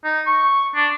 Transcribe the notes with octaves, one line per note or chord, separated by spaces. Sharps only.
D#4
C#6
D4